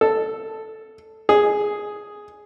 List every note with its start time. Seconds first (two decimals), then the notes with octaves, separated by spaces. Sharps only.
0.01 A4
1.29 G#4